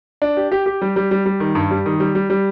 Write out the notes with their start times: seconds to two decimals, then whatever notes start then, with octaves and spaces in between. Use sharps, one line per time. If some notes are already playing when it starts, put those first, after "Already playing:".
0.22 D4
0.37 G4
0.52 G4
0.66 G4
0.82 G3
0.96 G3
1.11 G3
1.26 G3
1.40 D#3
1.55 G2
1.71 G3
1.86 D#3
2.00 G3
2.15 G3
2.30 G3